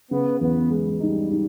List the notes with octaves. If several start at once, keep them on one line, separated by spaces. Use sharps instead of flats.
C#3 B3
E2 B3
G#3
G3 D#4
D#4